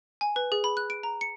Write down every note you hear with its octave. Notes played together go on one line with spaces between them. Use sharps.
G#5
B4
G#4
B5
F#6
D7
A#5
C#7